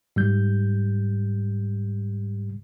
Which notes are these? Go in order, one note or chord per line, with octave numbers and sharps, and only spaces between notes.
G#2 G3 G6